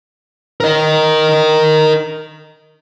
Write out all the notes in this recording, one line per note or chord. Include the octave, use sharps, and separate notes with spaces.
A#4 D#5